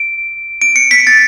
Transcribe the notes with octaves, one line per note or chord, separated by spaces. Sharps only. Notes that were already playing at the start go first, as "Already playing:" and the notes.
Already playing: D7
D7
C#7
B6
A6